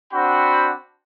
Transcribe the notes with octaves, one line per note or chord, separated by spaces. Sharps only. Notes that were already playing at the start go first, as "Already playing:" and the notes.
C4 D4 F#4 F#5 G5 B5